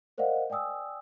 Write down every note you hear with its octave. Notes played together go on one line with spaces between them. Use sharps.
A#4 C5 D5 D#5 F5 F#5
D5 G5 G#5 D#6 E6